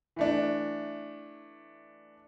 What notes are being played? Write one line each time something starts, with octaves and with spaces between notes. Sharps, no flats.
E3 A3 D4